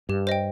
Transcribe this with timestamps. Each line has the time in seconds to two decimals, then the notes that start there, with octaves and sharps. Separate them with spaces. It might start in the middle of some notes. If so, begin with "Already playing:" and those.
0.09 G2 G4
0.27 C5 D#5 G5